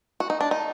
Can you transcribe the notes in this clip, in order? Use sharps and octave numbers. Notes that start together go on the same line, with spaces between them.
F#4
D#4
D4
D#4